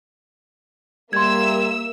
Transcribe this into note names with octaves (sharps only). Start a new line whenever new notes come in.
G3 A#3 E5 C6 E6 G#6